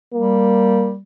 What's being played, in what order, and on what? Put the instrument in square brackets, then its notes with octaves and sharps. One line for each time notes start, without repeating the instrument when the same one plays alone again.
[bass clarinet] G3 [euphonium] A#3